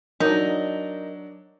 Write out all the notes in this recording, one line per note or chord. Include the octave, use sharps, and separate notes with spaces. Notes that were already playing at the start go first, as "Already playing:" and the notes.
F#3 D4 D#4 A#4